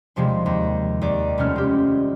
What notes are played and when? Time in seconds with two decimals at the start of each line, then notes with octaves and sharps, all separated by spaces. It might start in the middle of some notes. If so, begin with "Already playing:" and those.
0.16 D#2 C3 F3 G3 G#3
0.46 D#2
1.01 D#2 D5
1.38 F1 G3 A3 C#4 F6
1.56 G#3 G4